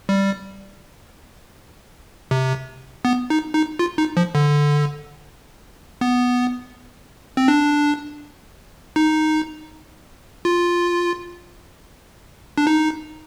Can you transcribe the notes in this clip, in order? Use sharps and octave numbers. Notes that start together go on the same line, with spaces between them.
G3
C3
B3
D#4
D#4
F4
D#4
F3
D3
B3
C4
D4
D#4
F4
D4
D#4